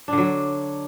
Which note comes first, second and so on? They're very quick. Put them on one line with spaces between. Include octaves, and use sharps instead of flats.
D4 D3 F#3